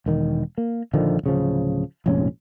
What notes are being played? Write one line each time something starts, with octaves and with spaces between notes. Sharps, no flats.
E1 D#3
A#3
A#1 D3 D#3 F3
D1 C#3 F3
F1 A#1 G#2 C#4